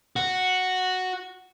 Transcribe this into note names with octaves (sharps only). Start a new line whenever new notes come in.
F#4